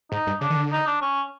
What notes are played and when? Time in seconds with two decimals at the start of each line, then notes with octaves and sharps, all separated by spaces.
0.12 G#2 D#4
0.27 G2
0.41 C#3 D4
0.50 D#3
0.56 D3
0.72 D#4
0.87 D4
1.01 C#4